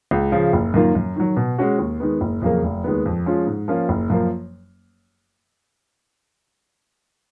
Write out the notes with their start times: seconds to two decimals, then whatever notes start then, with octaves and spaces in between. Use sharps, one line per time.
0.11 C#2
0.32 C#3 F3
0.53 F#1
0.74 F#2 D#3 A#3 F4
0.95 F#2
1.16 D#3 F#3
1.37 B2
1.58 G#3 C#4 F#4
1.78 D#2
2.00 D#3 G#3 B3
2.21 F#1
2.42 F2 C#3 F#3 A#3
2.63 F1
2.84 D#2 D#3 G#3 B3
3.06 F2
3.26 F3 G#3 C#4 F4
3.47 G#2
3.68 F3 A#3 C#4 F4
3.89 F#1
4.10 F#2 F3 A#3